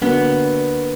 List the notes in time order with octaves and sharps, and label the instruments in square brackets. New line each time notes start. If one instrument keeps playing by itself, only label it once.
[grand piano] D3 A#3 D4 F#4 [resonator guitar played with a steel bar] B3